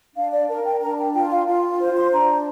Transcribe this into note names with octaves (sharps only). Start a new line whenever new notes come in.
D4 F5
D5
A#4
G5
D4 A#5
G5
F4 G5
F5
F4 F5
C5
C6
D4 A#5